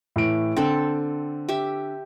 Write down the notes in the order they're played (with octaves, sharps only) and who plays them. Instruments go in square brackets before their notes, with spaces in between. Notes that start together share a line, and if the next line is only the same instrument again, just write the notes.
[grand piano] A2 E3 D7
[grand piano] D3 [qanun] C4 A4
[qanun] G4 E5